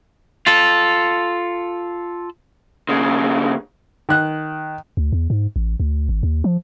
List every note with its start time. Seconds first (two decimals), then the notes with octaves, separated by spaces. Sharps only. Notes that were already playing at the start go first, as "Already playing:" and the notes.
0.47 F4 A4
2.89 D#2 C#3
4.09 D#3 F#6
4.97 D2
5.12 E2
5.30 G#2
5.56 A1
5.80 D2
6.09 G#1
6.23 D#2
6.44 F3